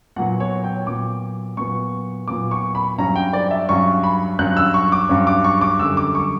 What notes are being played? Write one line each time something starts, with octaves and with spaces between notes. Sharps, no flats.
A#2 F#3 B3 F#5
C#5
G5
A#2 F#3 B3 D6
A#2 F#3 B3 C#6
A#2 F#3 B3 D6
C#6
B5
G2 F#3 C#4 A#5
G5
D5
E5
G2 F#3 C#4 C#6
B5
G2 F#3 C#4 F#6
E6
C#6
D6
G2 F#3 C#4
D6
C#6
D6
F#2 D3 G3 E6
D6
C#6